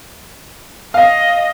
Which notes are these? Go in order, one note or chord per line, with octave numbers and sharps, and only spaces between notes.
D#5 F5